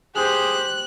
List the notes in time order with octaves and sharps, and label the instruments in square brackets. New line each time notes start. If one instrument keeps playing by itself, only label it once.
[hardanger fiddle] G4 C5 [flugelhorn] G#4 [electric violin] F#6